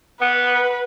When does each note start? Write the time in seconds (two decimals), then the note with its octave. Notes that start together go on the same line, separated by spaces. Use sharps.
0.22 B3 B4